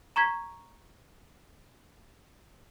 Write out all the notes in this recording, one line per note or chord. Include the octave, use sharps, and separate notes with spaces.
A#5 C#6 G#6 B6